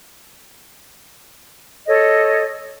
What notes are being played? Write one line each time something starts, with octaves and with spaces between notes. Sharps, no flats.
A4 C#5 D#5